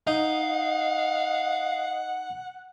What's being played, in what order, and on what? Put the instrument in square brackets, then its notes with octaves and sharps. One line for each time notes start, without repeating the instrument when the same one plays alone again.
[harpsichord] D#4 [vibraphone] D#5 D#6 [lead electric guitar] F5 [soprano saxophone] F#5